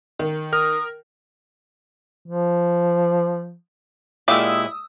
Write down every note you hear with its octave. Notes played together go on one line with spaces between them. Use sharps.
D#3
A#4 D#6 F6
F3
A#2 G#3 E4 G4 D5 F5 D#6 E6